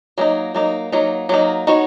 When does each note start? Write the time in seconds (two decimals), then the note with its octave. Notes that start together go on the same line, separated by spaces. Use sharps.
0.18 F#3 A#3 D#4
0.55 F#3 A#3 D#4
0.92 F#3 A#3 D#4
1.29 F#3 A#3 D#4
1.67 B3 D#4 F#4 C#5